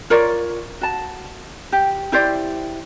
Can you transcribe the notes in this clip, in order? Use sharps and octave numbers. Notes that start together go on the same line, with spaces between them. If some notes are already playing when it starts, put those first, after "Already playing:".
F4 A#4 C#5 D5
F#4 A5
G4
E4 G4 C5 D5